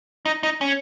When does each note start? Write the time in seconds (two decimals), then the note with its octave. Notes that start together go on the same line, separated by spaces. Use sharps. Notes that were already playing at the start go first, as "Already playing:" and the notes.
0.25 D#4
0.43 D#4
0.61 C#4